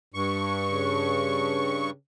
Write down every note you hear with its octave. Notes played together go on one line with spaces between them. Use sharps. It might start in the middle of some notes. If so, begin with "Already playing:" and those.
G2 C#6
C#3